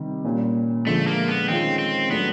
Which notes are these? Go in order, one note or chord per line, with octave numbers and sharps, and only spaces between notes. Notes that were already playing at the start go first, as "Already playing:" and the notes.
Already playing: C3 D#3 G3
A#2 G3 A#3 C#4
D3 F3 G#3 A3
A#3
B3
D#3 G#3 C4 C#4 F4
C4
A2 F#3 A3 B3 D4